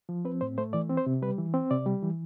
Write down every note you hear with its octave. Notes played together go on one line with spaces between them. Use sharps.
F3
C4 B4
A2 C5
A3 C5
E3 D5
C4
C5
C3
G3 B4
E3
C4
C3 D5
G3
E3